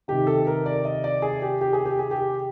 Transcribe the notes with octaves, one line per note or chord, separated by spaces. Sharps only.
C3 D#3 G4
A4
A#4
D5
D#5
D5
G#4
G4
G4
G#4
G4
G#4
G4